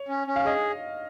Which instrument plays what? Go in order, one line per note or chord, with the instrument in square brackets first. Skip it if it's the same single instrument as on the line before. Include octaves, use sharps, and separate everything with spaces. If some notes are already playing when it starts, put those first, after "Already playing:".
Already playing: [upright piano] C#5
[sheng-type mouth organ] C#4
C#4
[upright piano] F5
[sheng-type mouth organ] G#4 [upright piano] D#5